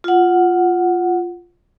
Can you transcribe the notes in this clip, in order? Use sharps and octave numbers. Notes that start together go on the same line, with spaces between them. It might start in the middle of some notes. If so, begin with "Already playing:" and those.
F4 F#5